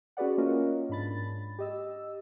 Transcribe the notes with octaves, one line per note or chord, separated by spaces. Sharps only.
C#4 F#4 G#4 B4 D5 F#5
A#3 C#4 F4 A#4 C#5 D#5
G#2 D4 B5 A6
G4 D#5 E6